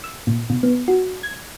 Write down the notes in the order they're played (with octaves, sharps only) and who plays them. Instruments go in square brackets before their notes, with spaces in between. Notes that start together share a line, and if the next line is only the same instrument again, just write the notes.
[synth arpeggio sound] E6
A#2
B2
B3
F#4
G#6